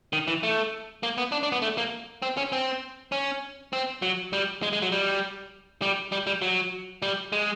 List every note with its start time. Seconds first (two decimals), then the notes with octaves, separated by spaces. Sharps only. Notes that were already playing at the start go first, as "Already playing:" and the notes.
0.13 D#3
0.28 E3
0.43 A3
1.03 A#3
1.18 B3
1.32 D4
1.43 D4
1.52 B3
1.62 A3
1.78 A#3
2.22 C4
2.37 C#4
2.52 C4
3.12 C#4
3.73 C4
4.02 F#3
4.33 G3
4.62 G#3
4.73 G#3
4.82 F#3
4.92 G3
5.82 G3
6.12 G3
6.27 G3
6.42 F#3
7.02 G3
7.32 G#3